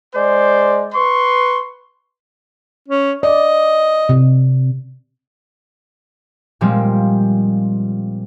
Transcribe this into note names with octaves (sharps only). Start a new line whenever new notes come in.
G#3 C5 D5
B4 C6 C#6
C#4
D5 D#5
C3
A#2 F3 G3 G#3 C4